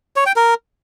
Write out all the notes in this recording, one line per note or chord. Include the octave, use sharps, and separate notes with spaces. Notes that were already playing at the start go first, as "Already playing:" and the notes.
C#5
G5
A#4